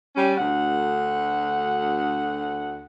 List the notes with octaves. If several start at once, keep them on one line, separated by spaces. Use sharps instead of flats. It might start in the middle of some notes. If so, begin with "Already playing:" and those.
G3 C#4
D2 F#5